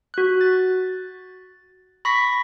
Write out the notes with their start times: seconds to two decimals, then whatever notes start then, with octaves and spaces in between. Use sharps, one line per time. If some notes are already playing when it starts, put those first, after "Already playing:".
0.14 F#4 F#6
0.41 A6
2.05 B5 C#6 A#6 B6